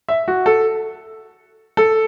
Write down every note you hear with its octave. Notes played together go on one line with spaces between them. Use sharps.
E5
F#4
A4
A4